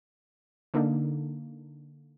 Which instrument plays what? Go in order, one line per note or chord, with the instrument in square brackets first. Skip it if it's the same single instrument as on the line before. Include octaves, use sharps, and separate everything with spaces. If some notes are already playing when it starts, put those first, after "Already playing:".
[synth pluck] D3 A#3 D4 D#4